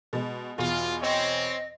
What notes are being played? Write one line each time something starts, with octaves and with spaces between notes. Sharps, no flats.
B2 G#3
E2 B2 F4
C4 C#5 D#5